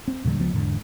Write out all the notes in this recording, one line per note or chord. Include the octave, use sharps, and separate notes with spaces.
C4
E2 A#2 D3 G3
C#2 F3 B3
E2 G#2 D3